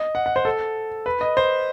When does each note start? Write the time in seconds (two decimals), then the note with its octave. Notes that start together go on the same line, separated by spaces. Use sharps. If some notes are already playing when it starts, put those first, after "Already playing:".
Already playing: D#5
0.15 F#5
0.26 F#5
0.36 C5
0.45 A4
1.06 B4
1.21 D#5
1.37 C5